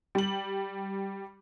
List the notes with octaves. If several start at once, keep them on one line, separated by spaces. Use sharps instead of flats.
G3 F#7